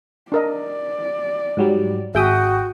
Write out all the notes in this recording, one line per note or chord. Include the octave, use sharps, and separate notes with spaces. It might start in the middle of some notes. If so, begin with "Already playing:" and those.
D4 A#4 D5 D#5
G#2 F#3 G3
G#1 F#4 G#4 E5 G5 D#6